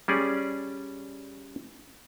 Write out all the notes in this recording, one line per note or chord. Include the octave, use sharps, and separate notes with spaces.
G3 C#4 G#4 D5